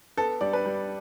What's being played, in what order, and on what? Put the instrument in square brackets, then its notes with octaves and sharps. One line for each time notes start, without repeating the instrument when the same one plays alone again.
[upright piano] B3 A4
G3 D5
B4
G3